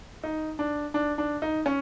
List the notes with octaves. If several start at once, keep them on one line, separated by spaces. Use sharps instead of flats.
D#4
D4
D4
D4
D#4
C#4